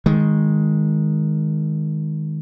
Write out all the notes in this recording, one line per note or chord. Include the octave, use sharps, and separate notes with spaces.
D#3 G#3